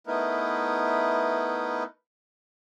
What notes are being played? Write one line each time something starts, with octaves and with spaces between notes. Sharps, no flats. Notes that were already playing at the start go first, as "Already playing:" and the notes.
A3 B3 D#4 E4 A#4 B4